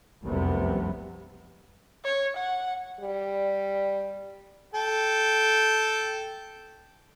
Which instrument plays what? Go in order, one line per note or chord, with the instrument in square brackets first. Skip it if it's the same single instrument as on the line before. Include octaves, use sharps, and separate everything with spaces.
[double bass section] F1 C2 F#2 C3 G3 B3
[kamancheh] C#5
F#5
[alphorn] G3
[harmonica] A4 G5